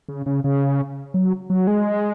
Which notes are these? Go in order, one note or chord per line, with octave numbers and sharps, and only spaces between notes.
C#3
C#3
C#3
F#3
F#3
G#3